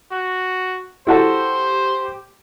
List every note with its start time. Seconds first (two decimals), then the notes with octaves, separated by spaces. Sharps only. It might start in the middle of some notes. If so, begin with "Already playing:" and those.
0.11 F#4
1.07 E4 F#4 G4 A4 C5